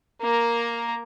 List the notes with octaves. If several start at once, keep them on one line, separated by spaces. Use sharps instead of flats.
A#3 A#4